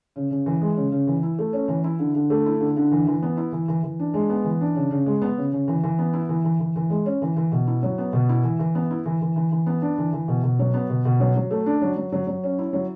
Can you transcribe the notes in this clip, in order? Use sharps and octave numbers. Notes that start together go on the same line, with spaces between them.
C#3
C#3
E3
G#3
C#3
C#3
E3
E4
A3
C#4
E3
E4
D3
D3
A3
E4
D3
D3
E3
E3
B3
E4
E3
E3
E3
D4
G#3
B3
E3
D4
C#3
C#3
G#3
B3
C#3
C#3
E3
E3
B3
E4
E3
E3
E3
E3
G#3
C#4
E3
E3
B2
E4
F#3
B3
B2
E4
E3
E3
B3
E4
E3
E3
E3
E3
B3
D4
E3
E3
B2
B2
F#3
B3
B2
B2
F#3
F#3
A3
D4
F#3
F#3
F#3
F#3
C#4
E4
F#3